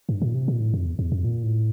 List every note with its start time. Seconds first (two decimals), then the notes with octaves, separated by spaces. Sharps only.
0.09 G2
0.22 A#2
0.35 C3
0.48 A#2
0.60 A2
0.74 F2
0.86 E2
0.99 E2
1.12 F2
1.24 A#2
1.43 A2